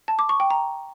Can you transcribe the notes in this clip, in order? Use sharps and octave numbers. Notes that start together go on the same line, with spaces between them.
A5
D6
C#6
G5
A#5